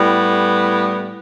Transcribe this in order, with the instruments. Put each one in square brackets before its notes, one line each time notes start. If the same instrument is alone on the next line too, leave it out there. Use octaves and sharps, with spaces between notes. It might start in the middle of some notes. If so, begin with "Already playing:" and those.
Already playing: [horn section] A2 G3 B3